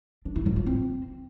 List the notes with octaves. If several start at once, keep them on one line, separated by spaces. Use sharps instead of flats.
D4
E4
F#3
F4
C4